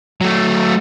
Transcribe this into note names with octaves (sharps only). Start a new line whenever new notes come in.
F#3 A3